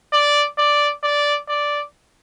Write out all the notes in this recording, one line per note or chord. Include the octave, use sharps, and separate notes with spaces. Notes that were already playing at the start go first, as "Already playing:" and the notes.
D5
D5
D5
D5